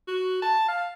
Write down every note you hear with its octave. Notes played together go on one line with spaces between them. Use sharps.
F#4
A5
F5